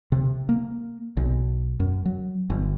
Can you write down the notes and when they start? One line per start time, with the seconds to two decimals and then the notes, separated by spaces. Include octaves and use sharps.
0.12 C3
0.49 A#3
1.17 B1
1.80 F#2
2.05 F#3
2.50 G1